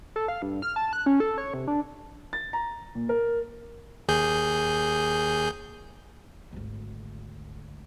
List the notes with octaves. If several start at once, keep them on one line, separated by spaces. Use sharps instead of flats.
A4
F5
G2
F6
A5
F#6
C#4
A4
C#5
C3
D4
A6
A#5
A#2
A#4
D#2 G#4 G6
G#1 D2